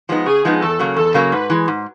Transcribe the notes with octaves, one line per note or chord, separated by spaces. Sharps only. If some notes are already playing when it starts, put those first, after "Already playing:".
F3 G#3 B3 D#4
C#3 G#4
F3 G#3 B3 D#4
E2 A4
C#3 F#3 A#3
E2 A4
C#3 F#3 A#3
G#2 B4
E3 G#3
G#2